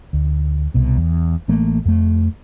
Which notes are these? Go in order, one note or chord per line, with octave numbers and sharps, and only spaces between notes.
D2
C2 B2
E2
A1 E3 A3 A#3
F2 A3